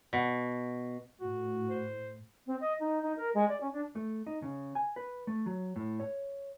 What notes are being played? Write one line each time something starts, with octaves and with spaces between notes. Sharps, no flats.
B2
A2 F#4
C5
C4
D#5
D#4
D#4
A#4
G#3
D5
C#4
D4
A3
D#4
C#3
G#5
B4
A3
F#3
A2
C#5